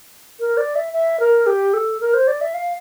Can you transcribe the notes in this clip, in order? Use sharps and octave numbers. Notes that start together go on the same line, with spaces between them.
A#4
D5
E5
E5
A#4
G4
A4
A#4
C5
D5
E5
F5